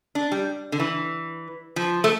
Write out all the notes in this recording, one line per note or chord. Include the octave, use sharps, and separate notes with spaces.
D4
G3
D3
E3
F3
A3